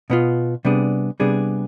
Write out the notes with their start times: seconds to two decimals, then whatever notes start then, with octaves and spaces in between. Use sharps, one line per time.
0.10 B2 B3 F4
0.65 C3 G3 B3 D4 G#4
1.20 C3 G3 B3 D4 G#4